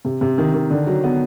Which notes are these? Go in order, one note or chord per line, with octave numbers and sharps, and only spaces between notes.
C3
C3
D#3
D#3
D3
F#3
B3